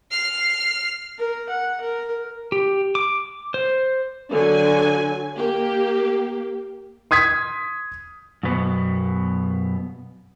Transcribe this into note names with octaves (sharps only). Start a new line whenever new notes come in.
F6 C7
A#4
F#5
A#4
G4
D6
C5
D3 F#3 G#5
A#3 G4
C6 D#6 G#6 B6
F#2 B2 B3